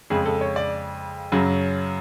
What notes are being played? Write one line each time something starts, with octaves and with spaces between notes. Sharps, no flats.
F2 C#3 G#3 G#4
A4
C#5
D5
F#2 C#3 F#3